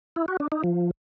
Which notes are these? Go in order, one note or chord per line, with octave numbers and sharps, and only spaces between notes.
E4
F#4
D4
D#4
F3